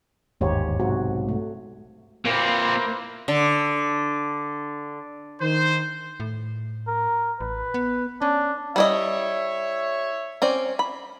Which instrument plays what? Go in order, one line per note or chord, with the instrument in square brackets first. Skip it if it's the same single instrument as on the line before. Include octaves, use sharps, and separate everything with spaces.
[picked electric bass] G1 D#2 G#2 [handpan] G4 C#5
[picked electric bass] B1 G#2 C3 [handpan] F#4
[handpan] A3
[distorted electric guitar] A#2 C4 [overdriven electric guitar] A#3 [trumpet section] E4 B4 C5
[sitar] D3
[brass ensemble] D#3 C5
[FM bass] A2
[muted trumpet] A#4
[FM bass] A1 [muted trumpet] B4
[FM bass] B3
[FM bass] C#4 [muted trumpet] D4
[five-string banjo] G3 E4 D#5 [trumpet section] C#5 E5
[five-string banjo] C4 C#4 D5
B5